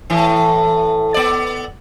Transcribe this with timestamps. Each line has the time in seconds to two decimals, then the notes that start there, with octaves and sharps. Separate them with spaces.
0.10 A2 E3
1.14 B3 D5